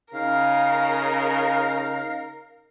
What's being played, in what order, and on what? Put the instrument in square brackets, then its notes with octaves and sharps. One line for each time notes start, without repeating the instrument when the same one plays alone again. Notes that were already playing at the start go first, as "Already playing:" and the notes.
[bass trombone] C#3 [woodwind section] D#4 F5 [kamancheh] A#4